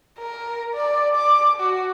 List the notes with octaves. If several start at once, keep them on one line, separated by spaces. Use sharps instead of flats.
A#4
D5
D6
F#4